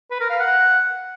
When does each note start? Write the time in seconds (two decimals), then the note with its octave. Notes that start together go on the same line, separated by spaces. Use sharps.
0.11 B4
0.20 A#4
0.30 F5
0.39 F#5